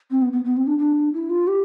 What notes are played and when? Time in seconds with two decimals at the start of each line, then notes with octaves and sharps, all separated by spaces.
0.11 C4
0.22 B3
0.33 B3
0.44 B3
0.57 C4
0.67 D4
0.78 D4
1.14 E4
1.30 F4
1.47 G4